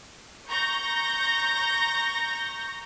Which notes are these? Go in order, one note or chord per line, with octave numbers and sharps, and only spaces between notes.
A#5 C#6 G6 A#6